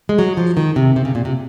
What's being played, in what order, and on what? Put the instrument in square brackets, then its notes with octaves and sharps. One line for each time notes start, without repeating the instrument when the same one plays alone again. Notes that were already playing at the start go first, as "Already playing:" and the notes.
[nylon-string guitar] G#3
F#3
F3
D#3
C3
C3
C#3
A#2
C3